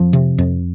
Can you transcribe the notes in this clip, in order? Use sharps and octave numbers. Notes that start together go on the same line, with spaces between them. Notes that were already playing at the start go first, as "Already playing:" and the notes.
Already playing: F2 F3
C3
F2